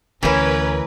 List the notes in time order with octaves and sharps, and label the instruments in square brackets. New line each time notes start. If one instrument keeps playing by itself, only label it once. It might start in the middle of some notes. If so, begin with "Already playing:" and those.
[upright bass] D2 A3 [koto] E3 E4 [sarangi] C#4 [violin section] A#4 B4